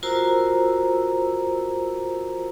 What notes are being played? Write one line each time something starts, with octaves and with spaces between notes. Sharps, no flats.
F4 F#4 A#4 C5 A#5 E6